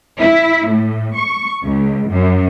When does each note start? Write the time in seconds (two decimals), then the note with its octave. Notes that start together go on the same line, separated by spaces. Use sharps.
0.19 E4
0.68 A2
1.17 C#6
1.63 C#2
2.10 F#2